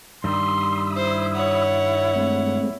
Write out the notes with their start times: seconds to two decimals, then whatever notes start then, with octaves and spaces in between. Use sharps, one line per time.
0.24 G2 D#3 G3 B5 C6 D#6 E6
0.96 E4 C5
1.35 C#5 F#5
2.16 G#3 A3 C4